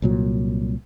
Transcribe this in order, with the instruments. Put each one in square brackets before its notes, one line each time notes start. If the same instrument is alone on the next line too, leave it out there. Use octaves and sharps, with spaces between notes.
[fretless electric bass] C2 A#2 F#3